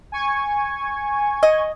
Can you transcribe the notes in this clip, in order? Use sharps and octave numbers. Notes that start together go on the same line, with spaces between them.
G#5 C#6 G#6
D#5